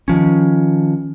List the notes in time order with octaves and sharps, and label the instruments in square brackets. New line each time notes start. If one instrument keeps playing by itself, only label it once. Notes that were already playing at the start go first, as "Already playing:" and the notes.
[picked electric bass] D#3 F3 C#4